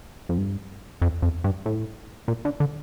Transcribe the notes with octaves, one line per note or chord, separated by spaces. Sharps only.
F2
G2
F2
F2
G2
A2
A#2
D3
D3